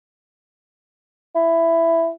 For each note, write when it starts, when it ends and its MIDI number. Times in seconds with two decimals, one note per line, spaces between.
1.35 2.09 64